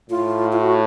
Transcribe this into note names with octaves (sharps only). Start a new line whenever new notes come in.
A2 F4
F4
F#4